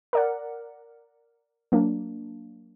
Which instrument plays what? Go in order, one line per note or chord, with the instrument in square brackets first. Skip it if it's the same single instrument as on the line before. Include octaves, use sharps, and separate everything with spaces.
[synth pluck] A#4 D5 F#5
F#3 A#3 D4